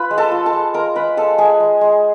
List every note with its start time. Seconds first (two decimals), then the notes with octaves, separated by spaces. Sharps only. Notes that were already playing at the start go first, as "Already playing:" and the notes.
Already playing: F4 B4 B5
0.11 G#3
0.18 A4 A5
0.32 F4
0.46 A4 A5
0.53 G#3
0.74 G#3 A#4 A#5
0.96 G#3 B4 B5
1.17 G#3 A4 A5
1.38 G#3 G#4 G#5
1.60 G#3
1.81 G#3